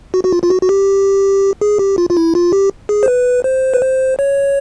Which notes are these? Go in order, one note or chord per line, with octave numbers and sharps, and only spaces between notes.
F#4
F#4
F4
F4
F#4
F#4
G4
G#4
G4
F4
F4
E4
F4
G4
G#4
C5
B4
C5
B4
C5
C#5